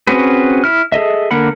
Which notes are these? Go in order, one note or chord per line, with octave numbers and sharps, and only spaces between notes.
C4 C#4 F#4 G#4 B4
E4 F6
G#4 A4 D#5 E5
D3 A#3 A#4 F#5 B5